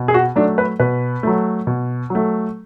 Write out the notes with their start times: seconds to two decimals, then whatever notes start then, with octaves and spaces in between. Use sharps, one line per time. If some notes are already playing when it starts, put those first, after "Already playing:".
Already playing: B2
0.08 G#4
0.14 F#4
0.36 F#3 A3 D4
0.58 B4
0.80 B2 B4
1.23 F#3 A3
1.67 B2
2.10 F#3 A3